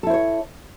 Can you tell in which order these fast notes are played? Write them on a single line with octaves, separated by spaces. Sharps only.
A4 E4 C5 C#5